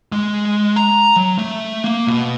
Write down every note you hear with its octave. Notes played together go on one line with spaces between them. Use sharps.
G#3
A#5
F#3
A3
A#3
B2